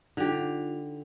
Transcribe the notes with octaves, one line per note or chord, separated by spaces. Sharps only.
D3 D#4 F4 G4 F7